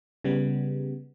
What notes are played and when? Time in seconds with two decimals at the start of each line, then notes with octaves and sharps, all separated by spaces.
0.24 C#3 G3 B3